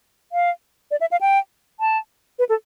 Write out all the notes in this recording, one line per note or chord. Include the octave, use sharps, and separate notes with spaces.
F5
D5
E5
F5
G5
A5
B4
A4